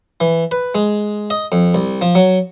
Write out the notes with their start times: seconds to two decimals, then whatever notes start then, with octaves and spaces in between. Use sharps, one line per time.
0.21 E3
0.51 B4
0.75 G#3
1.30 D#5
1.52 F2
1.74 C2
2.01 F3
2.15 F#3